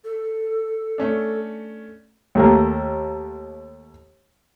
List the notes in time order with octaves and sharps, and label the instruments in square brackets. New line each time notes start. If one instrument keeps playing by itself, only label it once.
[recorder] A4
[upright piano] A3 C#4 D4
[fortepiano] D#2 A3 A#3